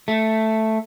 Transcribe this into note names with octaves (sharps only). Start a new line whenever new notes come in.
A3